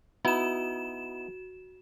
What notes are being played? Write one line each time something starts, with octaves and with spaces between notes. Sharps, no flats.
B3 D#4 E4 F#4 E7